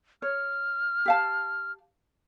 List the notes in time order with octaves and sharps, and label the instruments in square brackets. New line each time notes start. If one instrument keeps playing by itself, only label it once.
[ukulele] C#5 [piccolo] F6
[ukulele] G4 F5 A5